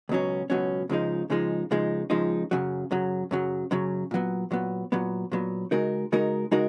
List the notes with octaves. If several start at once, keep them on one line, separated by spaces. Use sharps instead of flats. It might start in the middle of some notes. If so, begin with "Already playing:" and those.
C#2 B2 F#3 C#4
C#2 B2 F#3 C#4
C#2 C#3 F3 G#3 D#4
C#2 C#3 F3 G#3 D#4
C#2 C#3 F3 G#3 D#4
C#2 C#3 F3 G#3 D#4
F#2 C#3 F#3
F#2 C#3 F#3
F#2 C#3 F#3
F#2 C#3 F#3
A#2 F#3 B3
A#2 F#3 B3
A#2 F#3 B3
A#2 F#3 B3
C#3 G#3 D#4 F#4 A#4
C#3 G#3 D#4 F#4 A#4
C#3 G#3 D#4 F#4 A#4